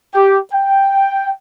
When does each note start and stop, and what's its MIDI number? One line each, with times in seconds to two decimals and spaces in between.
0.14 0.38 67
0.53 1.30 79